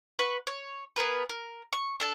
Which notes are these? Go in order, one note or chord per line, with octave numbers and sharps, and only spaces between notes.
B4 F#5 C#6
C#5
B3 G#4 A#4 B4
A#4
C#6
D4 A4 A5